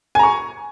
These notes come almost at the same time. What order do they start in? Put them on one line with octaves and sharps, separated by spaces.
G#5 A#5 C#6